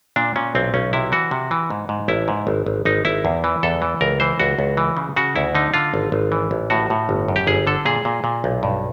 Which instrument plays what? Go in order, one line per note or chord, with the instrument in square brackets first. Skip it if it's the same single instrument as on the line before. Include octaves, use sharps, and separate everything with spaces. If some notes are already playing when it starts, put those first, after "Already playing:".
[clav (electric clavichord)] A#2 D4
A#2 C#4
B1 C4
B1 C#4
C3 E4
E3 F#4
C3
E3
G#2
G#2
A1 E4
G#2
G#1
G#1
G#1 D#4
G#1 E4
E2
E3
E2 A4
E3
C#2 A#4
E3 C5
C#2 F#4
C#2
E3
C#3
C#3 F#4
D2 E4
D3 D#4
D3 F4
G#1
G#1
E3
A1
A2 F#4
A2
G1
F#2
G4
G1 G#4
D3 A4
A#2 G#4
A#2
A#2
B1
G2